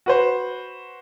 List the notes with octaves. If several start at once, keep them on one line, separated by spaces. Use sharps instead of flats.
F#4 B4 C5